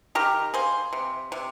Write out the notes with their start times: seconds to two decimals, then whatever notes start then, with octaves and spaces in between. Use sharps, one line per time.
0.15 D#3 G4 A#4
0.54 A#3 G#4 C5
0.93 C3
1.32 C3